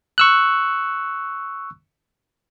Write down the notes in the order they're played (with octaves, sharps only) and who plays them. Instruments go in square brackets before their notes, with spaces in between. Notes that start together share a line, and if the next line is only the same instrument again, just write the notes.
[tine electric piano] C#6 E6 F#6